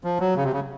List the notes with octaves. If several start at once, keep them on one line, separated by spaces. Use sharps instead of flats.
F3
F#3
C#3
C3
C#3